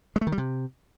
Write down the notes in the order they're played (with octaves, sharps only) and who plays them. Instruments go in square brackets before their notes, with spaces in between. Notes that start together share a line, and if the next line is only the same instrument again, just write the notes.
[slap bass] G#3
A3
D#3
G3
C3